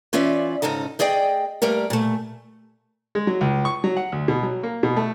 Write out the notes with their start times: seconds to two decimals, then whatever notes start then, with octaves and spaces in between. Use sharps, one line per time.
0.13 E3 C#4 F4 D5 E5
0.62 G#2 C#3 D#4 A4 D#5
0.99 A3 G#4 D5 D#5 G5
1.62 G3 A3 A#3 A#4
1.90 A#2 A3
3.15 G#3
3.27 F#3
3.41 C#2
3.65 C#6
3.84 F#3
3.97 F#5
4.12 D2
4.28 B2
4.43 F#3
4.63 A#3
4.83 B2
4.96 A3